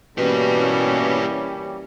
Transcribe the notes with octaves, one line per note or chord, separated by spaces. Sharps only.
B2 E3 G3 A#3 C#4 G4 B4